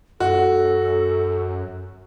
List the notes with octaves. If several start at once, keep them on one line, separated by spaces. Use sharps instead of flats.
F#2 F#4 A4